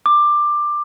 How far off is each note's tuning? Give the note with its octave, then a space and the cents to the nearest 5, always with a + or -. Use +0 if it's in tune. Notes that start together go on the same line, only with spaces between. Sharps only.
D6 +15